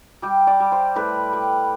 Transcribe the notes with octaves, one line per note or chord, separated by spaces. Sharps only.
G3 G4
D5
G3
C5
A2 B4
G3